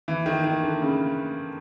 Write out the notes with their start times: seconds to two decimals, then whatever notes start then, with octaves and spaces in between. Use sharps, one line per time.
0.08 E3
0.26 D#3
0.44 D#3
0.63 D3
0.82 C#3